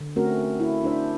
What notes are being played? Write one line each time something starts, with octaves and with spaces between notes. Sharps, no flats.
D3
A3 C4 C#4 F#4 A#4
E4
D4 C5 E5